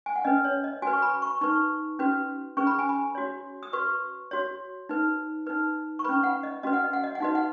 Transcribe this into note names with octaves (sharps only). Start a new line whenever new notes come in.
G#5
F#5
C#4 B4 D#5
C#5
D#5
F#4 B4 G#5
C#6
B5
C#6
D#4 B4 C#6
C#4 F#4 B4
C#4 G#4 B4 C#6
B5
G#5
B5
F#4 C#5
D#6
F#4 B4 C#6
F#4 C#5
D#4 B4
D#4 B4
C#6
C#4 B4 B5
F#5
D#5
C#4 F#4 B4 D#5
F#5
D#5
F#5
D#5
F#5
D#4 F#4 B4 D#5
F#5